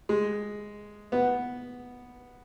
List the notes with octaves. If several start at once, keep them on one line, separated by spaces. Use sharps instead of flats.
G#3
B3